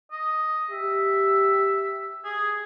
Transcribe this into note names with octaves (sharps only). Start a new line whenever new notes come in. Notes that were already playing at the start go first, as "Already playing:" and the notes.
D#5
G4 E5
G#4